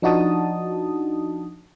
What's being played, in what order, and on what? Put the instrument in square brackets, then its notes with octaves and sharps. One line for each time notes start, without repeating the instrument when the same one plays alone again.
[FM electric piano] F3 D4 D#4 F#4 A5 D#6